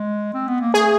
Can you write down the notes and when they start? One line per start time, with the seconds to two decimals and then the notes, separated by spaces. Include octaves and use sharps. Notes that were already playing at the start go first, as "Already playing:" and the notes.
Already playing: G#3
0.34 C4
0.48 B3
0.61 A#3
0.74 A3 G#4